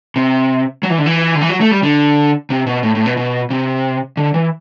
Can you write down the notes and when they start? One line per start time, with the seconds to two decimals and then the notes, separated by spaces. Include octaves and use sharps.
0.16 C3
0.83 F#3
0.90 E3
0.98 D3
1.06 E3
1.35 D3
1.41 E3
1.49 F#3
1.61 A3
1.71 G3
1.83 D3
2.50 C3
2.67 B2
2.83 A2
2.95 A2
3.06 B2
3.17 B2
3.50 C3
4.17 D3
4.34 E3